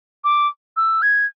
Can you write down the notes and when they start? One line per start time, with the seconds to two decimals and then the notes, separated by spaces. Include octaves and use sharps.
0.24 D6
0.77 E6
1.02 G#6